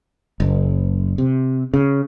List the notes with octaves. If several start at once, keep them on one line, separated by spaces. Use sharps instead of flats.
F#1
C3
C#3